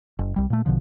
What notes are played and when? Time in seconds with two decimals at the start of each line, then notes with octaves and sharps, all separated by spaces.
0.19 F#1
0.36 C2 G3
0.50 A#2 A3
0.66 A#1 B2 D3 F3